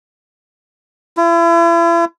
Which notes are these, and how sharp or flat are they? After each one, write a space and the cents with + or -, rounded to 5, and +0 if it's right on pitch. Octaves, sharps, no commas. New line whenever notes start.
E4 +40